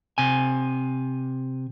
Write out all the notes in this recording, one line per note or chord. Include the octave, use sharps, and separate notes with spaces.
C3 G#5